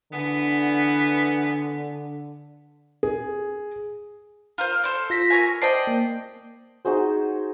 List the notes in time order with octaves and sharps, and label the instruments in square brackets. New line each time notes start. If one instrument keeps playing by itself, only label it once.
[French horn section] D3 [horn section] E3 B3
[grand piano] G#4
[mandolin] F4 A#4 C5
A4 C5 D5
[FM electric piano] F4 A#6 B6
[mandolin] A#4 C#5 G#5
[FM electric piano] C5 A5 C7 [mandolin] D5 D#5 G5
[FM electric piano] A#3
[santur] D#4 F#4 G#4 C5